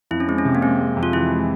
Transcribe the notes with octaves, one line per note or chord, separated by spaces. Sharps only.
F2 E4
C#4
G#3 C4
C#4
C3
A#3
G#3 C4
G#3
F2
F4
E3 E4
G#3